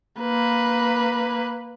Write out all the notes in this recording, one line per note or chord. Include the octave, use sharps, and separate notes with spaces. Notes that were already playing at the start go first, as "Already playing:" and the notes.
A#3 B4